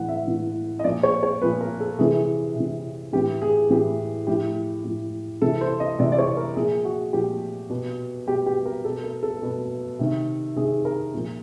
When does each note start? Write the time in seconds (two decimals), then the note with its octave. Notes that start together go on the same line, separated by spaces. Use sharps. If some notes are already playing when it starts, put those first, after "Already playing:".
Already playing: A2 E3 F#5
0.08 E5
0.27 A2 E3
0.79 D#5
0.84 A#2 F3 D5
1.03 C#5
1.23 C#5
1.42 A#2 F3 B4
1.61 A#4
1.80 A4
1.99 C3 E3 G#4
2.56 C3 E3
3.13 A2 E3 G4
3.42 G#4
3.70 A2 E3 G4
4.27 A2 F3 G4
4.84 A2 F3
5.42 C3 E3 A4
5.61 C5
5.80 D#5
5.99 C3 E3 D5
6.12 D5
6.19 C#5
6.37 A#4
6.56 A#2 F3 G#4
6.85 F#4
7.13 A#2 F3 G4
7.70 B2
8.27 B2 G4
8.46 G4
8.66 A#4
8.85 B2 A4
9.04 A#4
9.23 A4
9.42 B2
9.99 C3 D#3
10.56 C3 D#3 G#4
10.85 A#4
11.14 A#2 F3